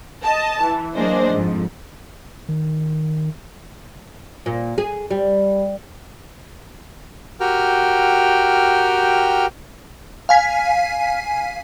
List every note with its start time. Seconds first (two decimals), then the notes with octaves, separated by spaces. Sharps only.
0.24 D#5 A5
0.62 E3
0.94 F#3 A#3 D4 G#4 C5 D#5
1.32 F2 G#2
2.48 D#3
4.46 A#2
4.78 G#4
5.11 G3
7.40 F#4 G4 A#4 G5 F6
10.29 F5 G#5 B6